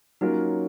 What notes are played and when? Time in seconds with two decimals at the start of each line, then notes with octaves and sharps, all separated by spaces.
0.21 F#3 A#3 C#4 D#4 F4 A#4